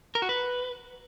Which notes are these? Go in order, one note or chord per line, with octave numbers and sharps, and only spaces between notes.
A#4
F#4
B4